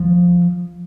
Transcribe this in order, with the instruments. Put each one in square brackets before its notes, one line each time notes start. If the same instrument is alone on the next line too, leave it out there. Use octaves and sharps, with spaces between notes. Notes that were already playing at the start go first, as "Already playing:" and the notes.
Already playing: [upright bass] F3